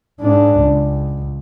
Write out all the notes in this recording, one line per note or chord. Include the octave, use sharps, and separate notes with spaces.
G#2 D4
C#2